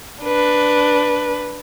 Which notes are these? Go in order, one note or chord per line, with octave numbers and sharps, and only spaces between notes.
D4 B4